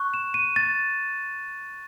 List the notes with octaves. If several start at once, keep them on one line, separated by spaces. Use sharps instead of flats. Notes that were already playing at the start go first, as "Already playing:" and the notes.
Already playing: C#6 F#6
E7
D#7
A6